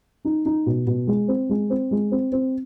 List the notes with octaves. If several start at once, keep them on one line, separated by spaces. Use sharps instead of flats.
D#4
D#4
B2
B2
G#3
C4
G#3
C4
G#3
C4
C4